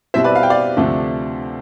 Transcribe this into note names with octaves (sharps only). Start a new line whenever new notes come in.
B2 G3 C4 E4 C5 E5
B4 D5
F5
G5
D5 F5
D2 C3 F3 A3 D4